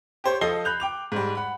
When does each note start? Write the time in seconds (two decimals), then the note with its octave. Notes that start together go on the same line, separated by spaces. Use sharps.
0.24 G4 C5 C#5
0.41 F3 A4 D#5 C7 G7
0.65 B5 F#6 G6 F7
0.80 G5 D6 F7
1.12 G#2 G3
1.35 F#5 B5